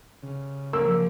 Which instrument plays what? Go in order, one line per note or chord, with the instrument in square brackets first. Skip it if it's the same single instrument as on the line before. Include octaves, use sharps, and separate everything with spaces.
[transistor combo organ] C#3
[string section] F3 F#3 [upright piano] A#3 [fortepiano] E6